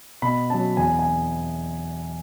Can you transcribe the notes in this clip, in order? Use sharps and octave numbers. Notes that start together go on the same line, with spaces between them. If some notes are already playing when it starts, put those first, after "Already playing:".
B2 B5
F#3 C#4 A5
E2 G#5
G#5